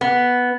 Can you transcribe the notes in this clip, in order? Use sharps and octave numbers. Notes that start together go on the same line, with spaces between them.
B3